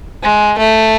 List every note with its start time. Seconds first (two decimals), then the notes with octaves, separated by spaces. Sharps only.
0.23 G#3
0.58 A3